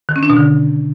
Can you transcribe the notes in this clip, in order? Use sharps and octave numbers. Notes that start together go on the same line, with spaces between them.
D#3
C#4
D4
B2
D3